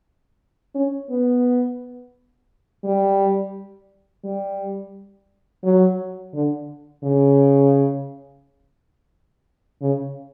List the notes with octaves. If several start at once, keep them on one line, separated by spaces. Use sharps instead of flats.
C#4
B3
G3
G3
F#3
D3
C#3
C#3